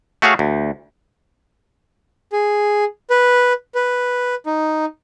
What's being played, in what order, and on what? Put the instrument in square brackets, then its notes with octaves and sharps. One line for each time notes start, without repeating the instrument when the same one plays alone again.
[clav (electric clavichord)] A3 F#4 G#4 C#5 F5
D2
[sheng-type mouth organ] G#4
B4
B4
D#4